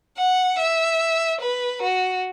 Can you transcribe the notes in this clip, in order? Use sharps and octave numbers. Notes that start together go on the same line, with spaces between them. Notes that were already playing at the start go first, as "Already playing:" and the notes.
F#5
E5
B4
F#4